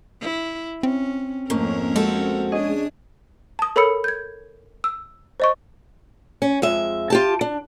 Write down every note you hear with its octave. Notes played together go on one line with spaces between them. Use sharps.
E4
C4 C#4
F2 G#2 A3 A#3 C#4 A#4
G#3 C4 F#4 A4
C#4 D4 G#4 D#5
A5 D#6
A4 A#4 C#5 B5 E6 C#7
G6 G#6
E6
C5 D#5 C#6
C#4
F2 G#3 E5
F4 G4 A5
D4